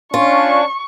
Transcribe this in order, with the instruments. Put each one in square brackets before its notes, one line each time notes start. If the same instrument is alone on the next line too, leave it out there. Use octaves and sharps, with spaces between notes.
[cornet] C#4 [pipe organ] D4 [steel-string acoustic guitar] F4 [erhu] C#6